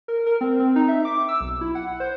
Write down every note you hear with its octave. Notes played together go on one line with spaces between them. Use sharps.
A#4
A#4
C4
C4
D#4
E5
D6
E6
B1
E4
F#5
C5